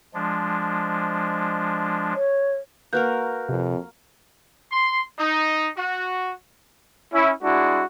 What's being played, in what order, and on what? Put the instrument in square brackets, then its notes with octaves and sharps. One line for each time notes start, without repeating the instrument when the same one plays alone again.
[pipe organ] F3 G#3 D4
[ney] C#5
[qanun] A#3 F#4 A#4 [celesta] B4 F#6 G6
[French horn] F2 [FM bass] C3
[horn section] C6
D#4
F#4
[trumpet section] C#4 E4
G#3 D4 E4 F#4